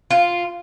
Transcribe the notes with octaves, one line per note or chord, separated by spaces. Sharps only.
F4